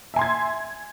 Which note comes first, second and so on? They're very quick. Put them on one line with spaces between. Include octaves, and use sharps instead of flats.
E5 G#5 C6 G#6